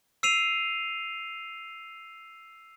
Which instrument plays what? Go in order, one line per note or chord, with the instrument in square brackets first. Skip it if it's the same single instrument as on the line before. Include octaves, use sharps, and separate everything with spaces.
[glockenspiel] E6 C7 D#7 F7